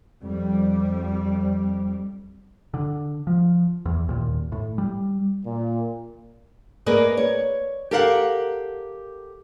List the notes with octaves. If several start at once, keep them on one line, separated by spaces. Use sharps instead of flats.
F2 G3
D3
F3
E2
D#2 A#2
A2
G3
A#2
A#3 G#4 A#4 B4 D5 D#5
C#5
G4 A4 A#4 F5 F#5